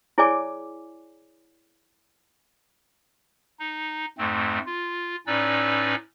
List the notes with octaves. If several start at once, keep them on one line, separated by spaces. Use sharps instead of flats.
E4 G#4 C#5 D5 G#5 D6
D#4
F2 G#2 A3 C4
F4
A2 C#4 D#4 B4 D5 E6